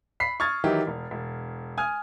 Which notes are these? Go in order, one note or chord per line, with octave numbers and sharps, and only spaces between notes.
B5 B6 C7
C#6 D#6 F6 G#6 A6
D#3 E3 F#3 D#4 E4 G4
E1
E1
G#5 D#6 F6 G#6